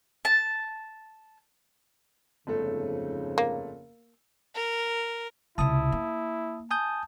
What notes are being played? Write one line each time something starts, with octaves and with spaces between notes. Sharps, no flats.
A5
G1 F2 G#2 C#3 A3 A4
A#3
A#4
C#2 C3 E4 A5 D#6
A#3
G#5 A5 D#6 G6